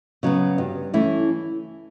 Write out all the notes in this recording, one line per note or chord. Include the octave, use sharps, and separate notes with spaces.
C#3 F#3 B3
G2
E3 A3 C#4 E4